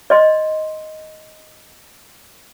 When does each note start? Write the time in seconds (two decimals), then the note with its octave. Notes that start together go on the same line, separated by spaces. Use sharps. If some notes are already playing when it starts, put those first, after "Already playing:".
0.10 D5 D#5 C6